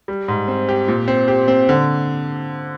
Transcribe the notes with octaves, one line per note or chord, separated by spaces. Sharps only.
G3
G#2
C4
G4
A#2
C4
G4
C4
D3